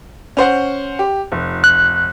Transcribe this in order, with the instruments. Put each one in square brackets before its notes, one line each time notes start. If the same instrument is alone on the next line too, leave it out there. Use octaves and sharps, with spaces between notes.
[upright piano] C#4 C5 F#5
G4
F1
[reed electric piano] F#6